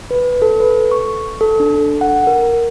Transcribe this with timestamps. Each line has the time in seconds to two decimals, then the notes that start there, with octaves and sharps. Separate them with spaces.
0.11 B4
0.42 A4
0.60 B4
0.92 C#6
1.41 A4
1.60 D4
2.01 F#5
2.27 A#4